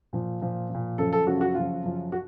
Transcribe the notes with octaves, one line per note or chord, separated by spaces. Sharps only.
A#2 F3
A#2 F3
A#2 F3
F#2 C#3 F3 A4
A4
F#2 C#3 F3 F#4
F#4
F#2 C#3 F3 F4
F#2 C#3 F3
F#4